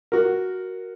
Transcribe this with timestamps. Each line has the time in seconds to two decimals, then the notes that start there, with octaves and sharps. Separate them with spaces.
0.12 F#4 A#4